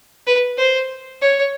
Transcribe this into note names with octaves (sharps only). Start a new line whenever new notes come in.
B4
C5
C#5